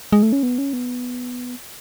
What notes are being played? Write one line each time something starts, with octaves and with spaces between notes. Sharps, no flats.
G#3
A3
C#4
B3
C#4
B3